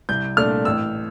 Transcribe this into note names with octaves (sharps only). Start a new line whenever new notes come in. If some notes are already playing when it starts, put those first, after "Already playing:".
C2 G6
A#2 A3 D4 F6
A1 E6